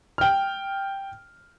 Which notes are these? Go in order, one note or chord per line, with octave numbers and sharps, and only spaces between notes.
G5 F6